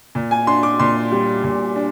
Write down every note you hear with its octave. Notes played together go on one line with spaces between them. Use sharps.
A#2
G#5
D4 C6
D6
A#2 C6
G3
A#2
D4